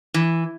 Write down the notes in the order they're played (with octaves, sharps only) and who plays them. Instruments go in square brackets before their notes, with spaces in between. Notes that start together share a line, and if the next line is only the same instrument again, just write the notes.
[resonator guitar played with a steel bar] E3